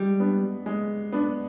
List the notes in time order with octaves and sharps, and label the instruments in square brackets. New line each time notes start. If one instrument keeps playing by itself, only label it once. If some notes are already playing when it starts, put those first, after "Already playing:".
Already playing: [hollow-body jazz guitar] G3 [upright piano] G#3
[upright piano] B3 D4
G#3
B3 D4